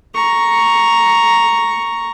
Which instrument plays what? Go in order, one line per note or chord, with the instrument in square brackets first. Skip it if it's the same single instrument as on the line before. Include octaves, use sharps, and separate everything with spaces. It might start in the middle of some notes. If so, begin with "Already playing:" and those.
[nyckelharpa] A#5 C#6